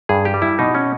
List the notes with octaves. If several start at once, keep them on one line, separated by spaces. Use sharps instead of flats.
G2 G#4
G4
G3
E4
B2 D#4
C#4